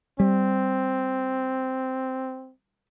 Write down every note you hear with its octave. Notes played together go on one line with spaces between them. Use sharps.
G3 C4